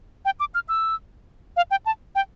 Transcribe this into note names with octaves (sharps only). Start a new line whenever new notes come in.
G5
D6
F6
E6
F5
G5
A5
G5